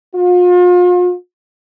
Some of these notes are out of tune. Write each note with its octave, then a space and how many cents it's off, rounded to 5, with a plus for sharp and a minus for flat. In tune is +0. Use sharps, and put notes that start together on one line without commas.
F4 +40